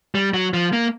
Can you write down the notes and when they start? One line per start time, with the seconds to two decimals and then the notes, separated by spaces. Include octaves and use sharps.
0.15 G3
0.34 F#3
0.54 F3
0.73 A#3